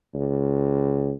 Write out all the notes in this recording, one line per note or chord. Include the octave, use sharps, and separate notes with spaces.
C#2